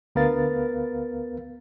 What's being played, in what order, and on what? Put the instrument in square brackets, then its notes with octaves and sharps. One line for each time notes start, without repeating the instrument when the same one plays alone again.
[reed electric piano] D2 B3 A#4 B4 F5 A6